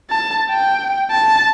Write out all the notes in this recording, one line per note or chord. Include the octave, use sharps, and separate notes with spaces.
A5
G5
A5